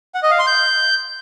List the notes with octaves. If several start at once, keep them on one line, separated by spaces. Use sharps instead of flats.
F#5
D#5
F5
C6
G6